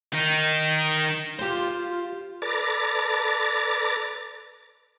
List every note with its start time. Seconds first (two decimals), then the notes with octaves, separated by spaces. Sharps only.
0.13 D#3 D#4
1.39 F4 G4 C5
2.42 A4 B4 D5 A#5 A6